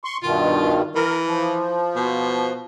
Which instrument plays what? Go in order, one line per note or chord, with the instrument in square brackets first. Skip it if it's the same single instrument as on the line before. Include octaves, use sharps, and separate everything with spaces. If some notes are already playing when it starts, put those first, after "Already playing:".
[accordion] C6 C#6
[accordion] G2 B2 D#3 [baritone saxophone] F4
[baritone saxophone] E3 [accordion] A#4
[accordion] F3
[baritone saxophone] B2